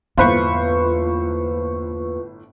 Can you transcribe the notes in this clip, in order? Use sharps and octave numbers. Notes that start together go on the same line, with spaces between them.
G1 E2 A2 A#3 F4 B4 C5 C#6